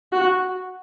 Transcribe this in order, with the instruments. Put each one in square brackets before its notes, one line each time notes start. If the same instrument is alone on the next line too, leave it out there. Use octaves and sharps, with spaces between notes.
[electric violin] F#4